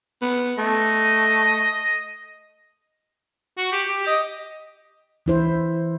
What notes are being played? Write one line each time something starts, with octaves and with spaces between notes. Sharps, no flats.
B3
A3 D#5
F#4
G4
G4
D#5
E3 E4 C5